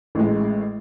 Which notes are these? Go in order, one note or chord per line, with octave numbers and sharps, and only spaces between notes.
A1 A2 G#3